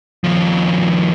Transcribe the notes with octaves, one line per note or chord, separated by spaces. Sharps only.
D#2 F3